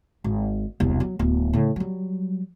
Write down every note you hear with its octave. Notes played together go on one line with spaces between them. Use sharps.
G#1
E1 C2
F#3
D1 B3
A2 C#3
F#3 G3